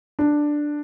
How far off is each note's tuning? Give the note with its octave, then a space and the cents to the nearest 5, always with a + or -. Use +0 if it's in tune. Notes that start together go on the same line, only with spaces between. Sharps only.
D4 +5